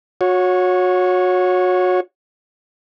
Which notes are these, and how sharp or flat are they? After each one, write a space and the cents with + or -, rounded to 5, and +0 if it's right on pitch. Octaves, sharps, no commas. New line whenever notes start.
F#4 -25 C#5 +0